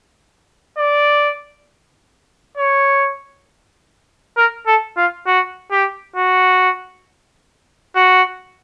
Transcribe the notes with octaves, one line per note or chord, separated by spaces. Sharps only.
D5
C#5
A#4
A4
F4
F#4
G4
F#4
F#4